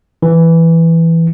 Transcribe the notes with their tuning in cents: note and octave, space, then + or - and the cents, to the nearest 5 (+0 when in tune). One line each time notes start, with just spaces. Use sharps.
E3 +0